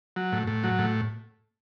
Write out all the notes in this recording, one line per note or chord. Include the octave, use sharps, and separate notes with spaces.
F#3
A2
A2
F#3
A2